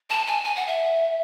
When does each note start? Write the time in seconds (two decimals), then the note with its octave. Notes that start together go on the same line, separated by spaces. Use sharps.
0.10 A5
0.27 G#5
0.44 G#5
0.56 F#5
0.67 E5